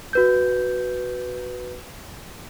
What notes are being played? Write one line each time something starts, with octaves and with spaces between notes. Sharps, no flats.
F#4 B4 G6